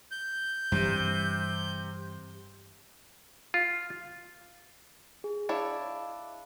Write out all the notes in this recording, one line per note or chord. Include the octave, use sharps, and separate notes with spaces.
G6
G2 C3 E3 G3
F4
G#4
D4 E4 C#5 D#5 F5